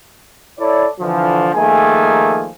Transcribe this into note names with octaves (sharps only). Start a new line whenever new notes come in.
E4 A4 C#5 D5
D3 E3 F3
D#3 F3 A3 A#3 G#4 G#5